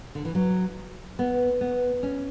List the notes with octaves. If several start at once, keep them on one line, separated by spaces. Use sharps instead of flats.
D3
E3
F#3
B3
B3
C#4